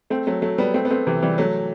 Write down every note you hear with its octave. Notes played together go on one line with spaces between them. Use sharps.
A3 C4
F#3 A3
F#3 A3
G3 B3
A3 C4
B3
A3 C4
C3 E3
E3 G3
F#3 A3